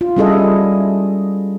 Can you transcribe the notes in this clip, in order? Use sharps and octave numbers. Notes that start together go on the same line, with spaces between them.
F4
G3 C#4 E4 G#4 A4 D#5